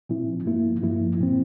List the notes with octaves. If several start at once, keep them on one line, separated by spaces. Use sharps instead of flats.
A#2 F3 C4 E4
G2 F3 A#3 E4
G2 F3 A#3 E4
A#2 F3 C4